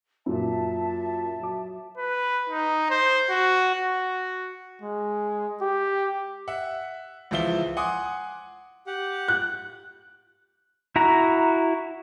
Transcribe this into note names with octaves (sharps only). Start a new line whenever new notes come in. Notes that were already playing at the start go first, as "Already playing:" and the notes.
F#2 A#2 E5 A5
F#3 D6
B4
D#4
C5
F#4
F#4
G#3
G4
E5 F#5
C#2 E3 F3 E5 F5 G7
F#5 G#5 C6 D6 D#6
G4 F#5
F#6
E4 F#4 A#5